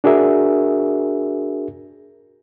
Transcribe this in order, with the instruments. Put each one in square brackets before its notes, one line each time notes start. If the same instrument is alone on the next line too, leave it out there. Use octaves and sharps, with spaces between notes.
[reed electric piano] D4 F#4 G#4 A#4 E5